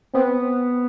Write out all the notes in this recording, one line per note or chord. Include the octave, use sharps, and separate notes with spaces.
B3 C4